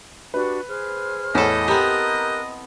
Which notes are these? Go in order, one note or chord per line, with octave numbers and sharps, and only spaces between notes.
D4 F#4 G4 B4
G#4 C5 F6
E2 A2 E4 A4 C#5 D#5
B3 C4 G4 A#4 A#5 F#6